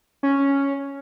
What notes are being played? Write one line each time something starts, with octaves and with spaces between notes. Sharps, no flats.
C#4